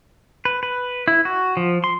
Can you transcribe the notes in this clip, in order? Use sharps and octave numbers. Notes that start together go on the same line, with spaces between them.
B4
B4
E4
F#4
F3
C6